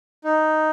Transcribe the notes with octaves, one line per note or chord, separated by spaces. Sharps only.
D#4